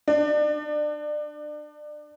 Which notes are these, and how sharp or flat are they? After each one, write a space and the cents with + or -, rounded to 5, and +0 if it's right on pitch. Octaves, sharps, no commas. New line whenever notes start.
D4 +25